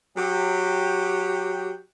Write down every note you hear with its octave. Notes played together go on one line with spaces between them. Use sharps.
F#3 G4